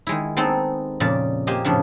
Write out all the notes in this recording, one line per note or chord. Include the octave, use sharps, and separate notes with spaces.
D#3 G#3 E4
G#3 B3 C4 D#4 A4
F2 A#2 C#3 D5
A#3 G4 C5 D#5 G#5
F2 A2 C#3 F3 D4